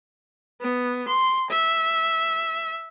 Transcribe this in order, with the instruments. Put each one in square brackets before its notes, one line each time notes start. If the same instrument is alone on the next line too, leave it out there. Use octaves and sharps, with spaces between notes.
[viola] B3
C6
E5